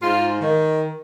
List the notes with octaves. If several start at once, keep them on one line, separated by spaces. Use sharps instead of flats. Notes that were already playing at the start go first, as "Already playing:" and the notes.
G#2 F4
D#3